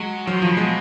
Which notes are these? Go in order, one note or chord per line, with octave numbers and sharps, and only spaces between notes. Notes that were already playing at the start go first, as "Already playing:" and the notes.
Already playing: F#3 G#3
F3 F#3
D#3
F3
C#3
B2 G#3